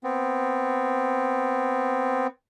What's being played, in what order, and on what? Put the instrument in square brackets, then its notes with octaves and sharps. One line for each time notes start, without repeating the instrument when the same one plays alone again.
[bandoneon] B3 C4